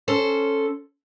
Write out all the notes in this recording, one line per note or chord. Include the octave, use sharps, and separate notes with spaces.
C#4 A4 C5